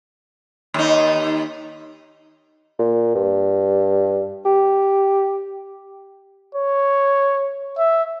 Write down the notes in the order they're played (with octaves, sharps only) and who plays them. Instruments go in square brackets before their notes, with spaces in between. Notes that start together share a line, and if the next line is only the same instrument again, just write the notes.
[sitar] D#2 D#4
[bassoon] A#2
G2
G4
[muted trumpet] C#5
E5